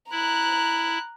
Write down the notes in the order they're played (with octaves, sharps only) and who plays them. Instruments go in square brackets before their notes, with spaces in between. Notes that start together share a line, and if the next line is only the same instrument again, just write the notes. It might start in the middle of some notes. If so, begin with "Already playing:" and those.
[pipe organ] E4 [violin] A#5 F#6